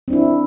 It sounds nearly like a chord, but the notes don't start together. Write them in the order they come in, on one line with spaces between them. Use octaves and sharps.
C4 D4 E4